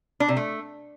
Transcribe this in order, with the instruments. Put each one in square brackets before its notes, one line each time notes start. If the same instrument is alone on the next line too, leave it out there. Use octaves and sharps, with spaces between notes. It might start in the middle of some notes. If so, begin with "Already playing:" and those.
[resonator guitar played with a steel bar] D4
C3
A3